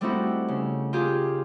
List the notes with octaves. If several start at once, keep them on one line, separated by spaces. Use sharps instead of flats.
G3 A3 C4 D#4 E4 F#4
C#3
F4 G4 G#4